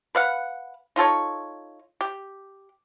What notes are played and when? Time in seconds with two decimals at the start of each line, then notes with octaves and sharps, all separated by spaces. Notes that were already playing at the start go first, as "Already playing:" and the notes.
0.15 B4 F5 F#5
0.96 D#4 F4 A4 C#5
2.01 G4